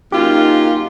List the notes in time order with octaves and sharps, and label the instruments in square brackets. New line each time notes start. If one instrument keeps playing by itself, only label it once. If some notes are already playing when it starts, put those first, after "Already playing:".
[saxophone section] F#2 F4 [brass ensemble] A#3 D#4 [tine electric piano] G4